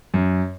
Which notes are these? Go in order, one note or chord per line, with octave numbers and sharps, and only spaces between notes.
F#2